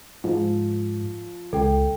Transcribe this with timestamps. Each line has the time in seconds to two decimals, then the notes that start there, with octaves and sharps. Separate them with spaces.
0.24 G#2 F3
1.53 C#2 A4 G5